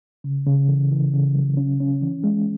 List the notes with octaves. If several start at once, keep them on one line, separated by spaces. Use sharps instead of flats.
C#3
C#3
E3
E3
C#3
F#3
C#4
C#4
E3
G#3